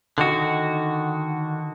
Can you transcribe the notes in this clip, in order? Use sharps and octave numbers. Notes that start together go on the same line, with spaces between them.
D3 D#3 F#4